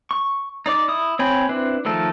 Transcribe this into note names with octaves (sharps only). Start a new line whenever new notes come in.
C#6
D#4 D5 D6
E4 D#6
C4 C#5 G5 G#5 B5
C4 D4 E4 B4
D#3 F3 A3 A4 A#4